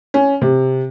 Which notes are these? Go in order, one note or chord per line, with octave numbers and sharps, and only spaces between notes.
C#4
C3